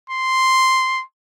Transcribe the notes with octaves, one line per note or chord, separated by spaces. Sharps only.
C6